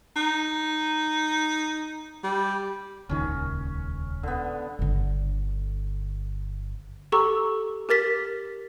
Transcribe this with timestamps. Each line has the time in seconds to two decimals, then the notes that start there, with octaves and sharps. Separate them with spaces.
0.16 D#4
2.24 G3
3.09 D#1 C#2 D#3 C#4
4.23 D3 B3
4.79 G1 D3
7.12 G4 A4 A#5 C#6 E6
7.89 G4 A#4 A6 B6